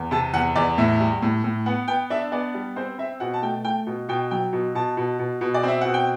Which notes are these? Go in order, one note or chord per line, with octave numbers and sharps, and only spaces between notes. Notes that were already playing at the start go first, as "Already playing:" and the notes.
Already playing: E2
C3 A5
E2 F#5
E2 D5
A2 E5
G3
A2
A2
B3 F#5
B3 G5
D4 E5
B3 D5
G3
C4 C5
C4 E5
B2 F#5
A5
A3 G5
A3 G5
B2
B2 G5
F#3 G5
B2
B2 A5
B2
B2
B2
D5
C4 E5
B2 F#5
G5